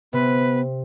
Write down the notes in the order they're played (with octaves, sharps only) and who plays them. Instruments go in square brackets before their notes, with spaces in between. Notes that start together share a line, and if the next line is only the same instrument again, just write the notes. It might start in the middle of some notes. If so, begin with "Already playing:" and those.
[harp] C3 [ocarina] B3 [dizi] B4